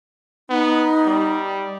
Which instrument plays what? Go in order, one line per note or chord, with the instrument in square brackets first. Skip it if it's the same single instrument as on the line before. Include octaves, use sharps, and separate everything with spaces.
[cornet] B3 [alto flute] D#4
[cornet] G3